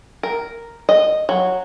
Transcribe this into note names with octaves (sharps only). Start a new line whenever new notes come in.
A#4
D#5
F#3